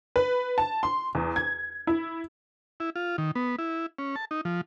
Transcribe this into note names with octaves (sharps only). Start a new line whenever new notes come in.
B4
A5
C6
E2
G#6
E4
E4
F4
D#3
B3
E4
C#4
A5
D#4
F3